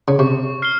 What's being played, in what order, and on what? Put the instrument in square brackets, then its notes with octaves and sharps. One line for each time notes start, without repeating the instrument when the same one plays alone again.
[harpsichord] C#3
[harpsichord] C3 [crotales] C#6
[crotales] F6 C7 G7